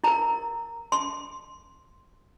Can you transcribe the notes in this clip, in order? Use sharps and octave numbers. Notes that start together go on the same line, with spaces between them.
E4 A#4 A#5
C6